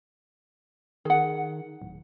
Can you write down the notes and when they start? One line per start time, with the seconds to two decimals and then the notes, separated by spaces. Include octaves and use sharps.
1.05 D#3 G#4 F#5
1.82 D1